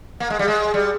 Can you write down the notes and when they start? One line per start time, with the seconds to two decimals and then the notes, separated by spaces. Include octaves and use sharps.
0.20 A#3
0.30 G#3
0.39 G3
0.48 G#3
0.74 G3